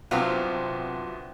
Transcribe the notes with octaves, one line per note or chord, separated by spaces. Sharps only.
C2 F#3 B3 C4 D4 F4 C5 G5